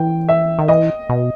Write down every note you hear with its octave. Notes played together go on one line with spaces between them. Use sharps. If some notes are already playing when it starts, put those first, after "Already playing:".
Already playing: E3 G5
E5
D#3
E3 D#5
B2